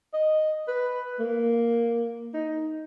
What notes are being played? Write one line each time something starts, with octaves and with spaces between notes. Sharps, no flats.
D#5
B4
A#3
D#4